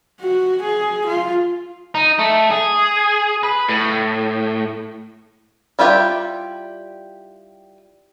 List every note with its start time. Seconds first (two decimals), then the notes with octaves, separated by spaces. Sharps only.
0.21 F#4
0.62 G#4
1.07 F4
1.95 D#4
2.19 A3
2.51 G#4
3.43 B4
3.69 A2
5.79 G3 E4 F4 G4 B4